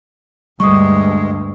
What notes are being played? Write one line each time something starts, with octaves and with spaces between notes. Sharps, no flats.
D2 G2 G3 G#3 C#6 D#6